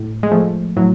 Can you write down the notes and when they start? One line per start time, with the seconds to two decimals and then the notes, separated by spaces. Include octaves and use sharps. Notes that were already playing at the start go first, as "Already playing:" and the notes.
Already playing: A2
0.23 G#3
0.31 F3 A3
0.76 A2 F#3